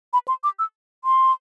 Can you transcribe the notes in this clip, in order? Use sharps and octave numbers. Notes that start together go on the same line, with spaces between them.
B5
C6
D6
E6
C6